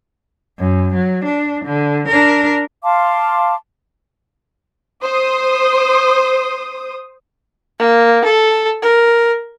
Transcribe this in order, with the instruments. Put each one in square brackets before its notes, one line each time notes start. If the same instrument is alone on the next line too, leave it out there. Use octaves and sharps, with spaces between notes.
[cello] F#2
F#3
D4
D3
D4 A#4
[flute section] F5 A5 C6 D6
[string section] C5 D#6
[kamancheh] A#3
A4
A#4